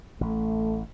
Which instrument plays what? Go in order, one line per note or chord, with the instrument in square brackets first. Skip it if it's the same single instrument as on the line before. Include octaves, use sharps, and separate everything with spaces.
[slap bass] A1 [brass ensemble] A3